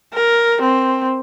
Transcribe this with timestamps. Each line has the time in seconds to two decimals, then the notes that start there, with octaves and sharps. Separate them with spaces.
0.14 A#4
0.62 C4